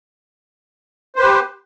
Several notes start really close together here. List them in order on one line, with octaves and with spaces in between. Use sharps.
C5 B4 G4